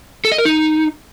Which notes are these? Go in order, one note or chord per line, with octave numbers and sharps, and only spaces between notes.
A4
D#5
A#4
D#4